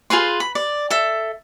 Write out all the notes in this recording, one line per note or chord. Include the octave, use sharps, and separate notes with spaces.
F4 G#4 B4 C6
B5
D5
A4 E5